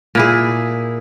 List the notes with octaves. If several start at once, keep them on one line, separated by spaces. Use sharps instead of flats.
A#2 E4 G#4